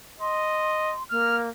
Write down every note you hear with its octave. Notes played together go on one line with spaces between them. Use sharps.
D#5 C6
A#3 F6